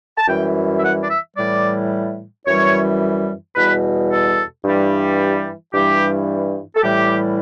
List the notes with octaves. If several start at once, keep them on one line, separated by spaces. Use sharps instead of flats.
A5
F#2 E3 G3 G5
E5
F#5
D5
E5
A2 E3 G3 D5
F#2 E3 G3 C#5
E2 B2 G3 B4
A4
G2 E3 G3
G4
G2 E3 G3 G4
A4
A2 E3 G3 G4